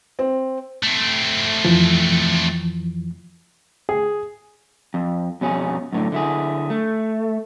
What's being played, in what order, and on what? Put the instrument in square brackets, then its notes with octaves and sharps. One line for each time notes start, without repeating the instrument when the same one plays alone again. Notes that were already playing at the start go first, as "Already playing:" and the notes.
[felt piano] C4
[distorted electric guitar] A3 C4
[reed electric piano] F2 E3 F3
[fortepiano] G#4
[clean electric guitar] F2
F2 B2 C#4 G#4
F#2 A2 D3
D3 E4 G#4
A3